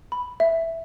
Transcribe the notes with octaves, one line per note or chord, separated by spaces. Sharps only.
B5
E5